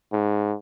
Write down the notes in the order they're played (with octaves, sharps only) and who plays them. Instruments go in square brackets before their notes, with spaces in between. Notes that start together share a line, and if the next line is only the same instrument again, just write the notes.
[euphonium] G#2